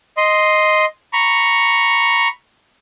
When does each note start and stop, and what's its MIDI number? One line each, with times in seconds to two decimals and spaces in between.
0.17 0.85 75
0.17 0.85 84
1.13 2.28 82
1.13 2.28 83
1.13 2.28 85